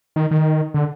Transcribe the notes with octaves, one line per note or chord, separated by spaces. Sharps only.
D#3
D#3
D3